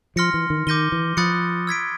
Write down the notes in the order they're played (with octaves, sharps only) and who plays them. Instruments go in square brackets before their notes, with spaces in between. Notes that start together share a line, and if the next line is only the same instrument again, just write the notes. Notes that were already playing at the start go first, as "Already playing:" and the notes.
[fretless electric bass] F3 [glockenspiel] C6 F6 A#6 C#7
[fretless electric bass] E3
D#3
[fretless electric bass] D#3 [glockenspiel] D6 G6 A#6 D#7 G7
[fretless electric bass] E3
[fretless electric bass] F3 [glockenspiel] B5 D#6 F#6 A6 C#7
[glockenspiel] E6 G#6 B6 D7